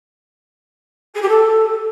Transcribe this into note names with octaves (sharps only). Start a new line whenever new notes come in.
G#4
G4
A4